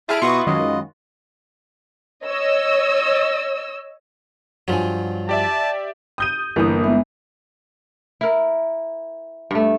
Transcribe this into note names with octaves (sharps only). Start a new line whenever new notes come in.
E4 G#4 A5 B5 F6 D7
B2 F4 F#4 B4 C#6 D#6
F#2 D#3 F#3 G#3 D#5
C#5 D#5 E6
G2 F3 F#3 G#5
G4 D5 E5 A5
D#6 G6 D#7
G1 E3 A#3 A#4 D#6
G#3 B3 E5
E4 A#4
G2 A3